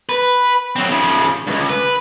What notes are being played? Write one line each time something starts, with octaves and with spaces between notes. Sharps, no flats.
B4
F#3 C4
C#3 F3
C#2 G2
B4